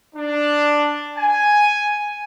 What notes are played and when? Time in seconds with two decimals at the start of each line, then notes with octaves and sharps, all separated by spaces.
0.15 D4
1.16 G#5